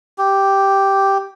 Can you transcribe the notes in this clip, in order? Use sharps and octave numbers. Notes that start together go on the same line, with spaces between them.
G4